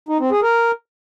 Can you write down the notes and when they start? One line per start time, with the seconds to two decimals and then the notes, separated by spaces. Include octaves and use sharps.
0.09 D#4
0.20 C4
0.31 G#4
0.42 A#4